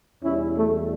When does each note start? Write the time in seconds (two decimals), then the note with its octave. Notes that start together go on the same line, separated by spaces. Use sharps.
0.24 E2 B2 G3 C#4 E4
0.56 A3